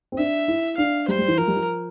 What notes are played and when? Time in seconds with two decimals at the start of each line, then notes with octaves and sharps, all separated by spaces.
0.12 C4
0.18 D4 E5
0.48 E4
0.77 D4 F5
1.08 G3 C5
1.19 G3
1.28 E3
1.38 F3 A#4
1.47 G3
1.56 F3